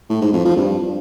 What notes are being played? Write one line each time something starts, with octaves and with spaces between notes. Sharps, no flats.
A2
G#2
F2
F3
G2